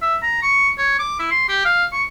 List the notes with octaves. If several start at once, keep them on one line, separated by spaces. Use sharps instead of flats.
E5
A#5
C#6
C#5
D6
E4
C6
G4
F5
C#6